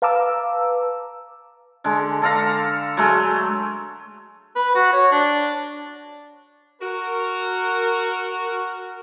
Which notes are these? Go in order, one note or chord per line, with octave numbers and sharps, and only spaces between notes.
B4 F5 A5 A#5 D6 E6
D3 G#3
D3 A4 F5 A#5
F#3 G#3 A3
B4
F#4
C#5
D4
F#4 A#4